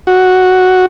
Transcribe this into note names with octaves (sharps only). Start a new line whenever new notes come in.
F#4